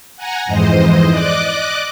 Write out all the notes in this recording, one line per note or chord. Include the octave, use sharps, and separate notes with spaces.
F#5 G#5 A#5
F2 G#2 E3 G#3 C5 D#5
D5 D#5 D6 F#6